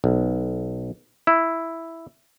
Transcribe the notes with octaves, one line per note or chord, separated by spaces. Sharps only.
B1
E4